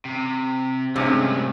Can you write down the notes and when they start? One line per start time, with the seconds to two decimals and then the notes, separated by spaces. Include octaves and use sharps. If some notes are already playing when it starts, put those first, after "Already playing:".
0.05 C3
0.96 C2 G2 C3 G#3 A3 C#4